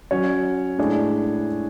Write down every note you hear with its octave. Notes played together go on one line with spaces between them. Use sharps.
F#3 C#4 F#4 C#5
A2 G#3 D4 G#4 C#5